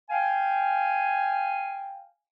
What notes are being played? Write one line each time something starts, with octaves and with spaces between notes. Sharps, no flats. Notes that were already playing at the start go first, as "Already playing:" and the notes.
F5 G5 G#5